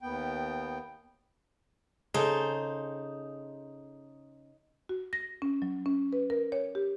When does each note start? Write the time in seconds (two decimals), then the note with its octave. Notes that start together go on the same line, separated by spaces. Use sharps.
0.02 D#2 B3 G5
2.14 C#3 D#4 G#4 A4 C5
4.89 F#4
5.13 A#6
5.42 C#4
5.62 F#3
5.86 C#4
6.13 B4
6.30 A#4
6.52 C#5
6.75 G4